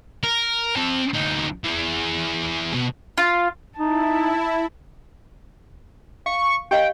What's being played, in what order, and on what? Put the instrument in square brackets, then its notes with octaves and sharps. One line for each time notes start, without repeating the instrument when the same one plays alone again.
[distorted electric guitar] A#4
C4 A5
D2 D#4
E3 G#4
B2
[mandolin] F4
[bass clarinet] D#4 [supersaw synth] E4 [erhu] A5
[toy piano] F5 [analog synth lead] C#6
[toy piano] G4 D#5 F5 [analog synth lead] G5